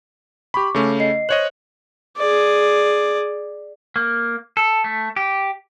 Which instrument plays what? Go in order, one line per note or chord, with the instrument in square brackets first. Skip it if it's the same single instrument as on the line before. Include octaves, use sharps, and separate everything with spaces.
[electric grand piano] G4 B5 [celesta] C#6 D6
[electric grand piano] C#3 A3 C#4
[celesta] D#5 C7
[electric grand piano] C5 C#5 D#5 [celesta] F#6 F#7
[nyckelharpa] G#4 D5
[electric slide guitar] A#3
A4
A3
G4